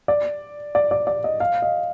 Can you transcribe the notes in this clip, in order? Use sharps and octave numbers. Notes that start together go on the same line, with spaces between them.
D5
D5
D5
D5
D#5
F5
D#5